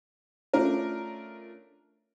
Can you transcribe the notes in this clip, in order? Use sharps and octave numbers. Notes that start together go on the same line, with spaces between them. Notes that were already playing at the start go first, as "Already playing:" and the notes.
A3 C#4 D4 F4 A#4